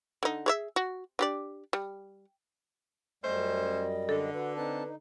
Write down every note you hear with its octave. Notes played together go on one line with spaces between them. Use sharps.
D3 D#4
G#4 C#5 E5
F#4
D4 G4 D5
G3
F#2 G3 A3 C#4 C5 D#5
D3 A4
F#4 B4
C4 D#4 B4 A5
D#4